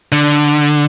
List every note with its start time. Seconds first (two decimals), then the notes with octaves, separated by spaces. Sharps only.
0.12 D3